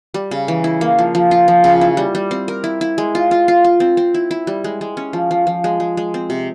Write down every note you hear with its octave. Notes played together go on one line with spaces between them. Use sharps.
G3
C#3
E3
E4
A#3
F3
F3
F4
F3
C#3
E4
G3
G3
C4
A#4
E4
E4
G#3
F4
F4
F4
F4
C4
C4
E4
E4
G3
G#3
G#3
C#4
F3
F3
F3
G#3
G#3
G#3
C4
C3